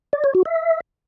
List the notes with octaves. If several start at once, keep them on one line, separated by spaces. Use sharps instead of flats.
D5
C#5
F#4
E5